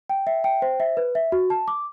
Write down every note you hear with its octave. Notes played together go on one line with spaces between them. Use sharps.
G5
E5
G5
C5
E5
B4
E5
F#4
A5
D6